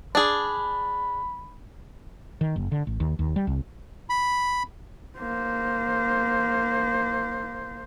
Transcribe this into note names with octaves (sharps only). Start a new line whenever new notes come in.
D4 G#4 B5
D#3
F#1
D3
A1
D#2
D#2
G3
C2
B5
A#3 C5